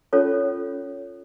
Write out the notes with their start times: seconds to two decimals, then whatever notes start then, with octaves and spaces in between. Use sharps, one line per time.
0.13 C#4 F4 A4 C#5